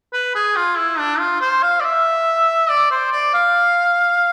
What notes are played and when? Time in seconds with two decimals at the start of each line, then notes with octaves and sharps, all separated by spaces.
0.13 B4
0.35 G#4
0.56 F4
0.78 E4
0.98 D4
1.19 F4
1.41 C5
1.63 F5
1.80 D5
1.84 E5
2.69 D5
2.91 C5
3.12 D5
3.34 F5